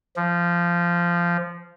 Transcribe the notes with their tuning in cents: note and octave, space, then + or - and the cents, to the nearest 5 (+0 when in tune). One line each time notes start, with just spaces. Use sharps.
F3 -15